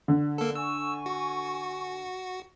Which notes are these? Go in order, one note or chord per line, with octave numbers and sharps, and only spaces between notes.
D3
A#3 A4
G#5 C#6 E6
F#4